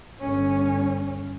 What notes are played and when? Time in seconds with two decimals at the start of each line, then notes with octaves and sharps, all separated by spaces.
0.21 G1 C#4